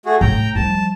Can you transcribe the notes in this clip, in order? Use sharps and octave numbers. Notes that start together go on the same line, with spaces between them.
A3 F#4 G#4
A2 G5 A#5
F3 G3 A5